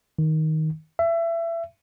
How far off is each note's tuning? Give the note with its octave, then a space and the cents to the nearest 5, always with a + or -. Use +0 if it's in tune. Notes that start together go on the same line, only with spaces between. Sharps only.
D#3 +10
E5 +25